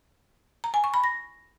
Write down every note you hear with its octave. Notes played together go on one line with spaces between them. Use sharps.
A#5
G#5
C#6
B5
A#6